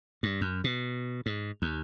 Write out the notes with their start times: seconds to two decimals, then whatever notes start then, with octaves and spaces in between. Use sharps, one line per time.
0.23 G2
0.41 F#2
0.64 B2
1.26 G#2
1.62 D#2